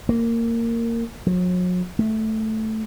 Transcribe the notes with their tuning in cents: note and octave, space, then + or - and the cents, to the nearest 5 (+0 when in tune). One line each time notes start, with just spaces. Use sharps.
A#3 -15
F#3 -40
A3 -5